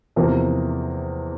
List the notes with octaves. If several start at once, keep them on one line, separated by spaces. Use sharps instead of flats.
E2 C3 F3 A#3